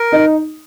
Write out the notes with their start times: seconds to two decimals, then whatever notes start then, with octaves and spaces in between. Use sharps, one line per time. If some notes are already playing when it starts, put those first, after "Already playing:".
Already playing: A#4
0.12 D#4